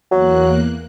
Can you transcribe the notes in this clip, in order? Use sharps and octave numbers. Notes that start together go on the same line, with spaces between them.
E2 F#3 A#3 F#6